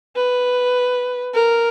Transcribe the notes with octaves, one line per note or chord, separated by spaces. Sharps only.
B4
A#4